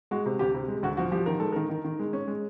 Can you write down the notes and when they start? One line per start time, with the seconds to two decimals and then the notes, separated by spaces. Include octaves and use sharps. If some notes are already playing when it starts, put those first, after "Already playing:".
0.11 G#3 F#4
0.26 C3
0.39 D2 G4
0.54 C3
0.68 G#3
0.83 D2 F#4
0.97 F3 F#4
1.12 F3 G4
1.26 D#3 A#4
1.40 G#3 A4
1.52 D#3 A#4
1.69 D#3
1.85 D#3
1.99 G#3
2.13 C#4
2.27 G#3